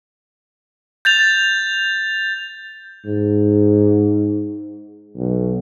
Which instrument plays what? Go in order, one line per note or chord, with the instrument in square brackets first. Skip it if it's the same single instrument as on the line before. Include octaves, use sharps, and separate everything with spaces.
[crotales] G6 A6 F7
[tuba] G#2
B1